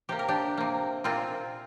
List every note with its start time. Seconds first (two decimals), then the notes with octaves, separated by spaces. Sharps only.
0.09 C3 A#3 G4
0.19 A#4
0.28 D4 G4
0.58 C3 A#3
1.04 A#2 A#3 C4 F4